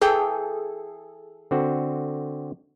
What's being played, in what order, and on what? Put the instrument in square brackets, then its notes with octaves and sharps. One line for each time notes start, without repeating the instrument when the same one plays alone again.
[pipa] E3 G5 [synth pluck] G#4 A4
[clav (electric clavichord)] D3 C4 F#4